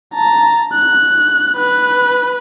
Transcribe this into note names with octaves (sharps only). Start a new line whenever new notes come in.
A5 A#5
F#6
B4 F#6